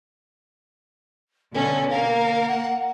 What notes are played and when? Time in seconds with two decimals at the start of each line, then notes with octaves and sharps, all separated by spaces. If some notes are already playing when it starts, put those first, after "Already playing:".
1.54 B2 D3 C#4 A4
1.90 A#3 A#4 F5
2.48 F#5